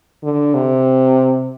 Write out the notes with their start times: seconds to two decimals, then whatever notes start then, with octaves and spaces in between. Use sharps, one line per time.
0.23 D3
0.54 C3